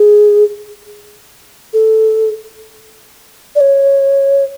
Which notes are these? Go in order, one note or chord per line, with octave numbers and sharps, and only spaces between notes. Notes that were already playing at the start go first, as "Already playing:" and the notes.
Already playing: G#4
A4
D5
C#5